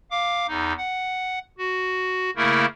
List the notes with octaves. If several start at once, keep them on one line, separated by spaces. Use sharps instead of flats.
F5 D6
E2 D#4
F#5
F#4
C#3 A3 A#3 E4 A#4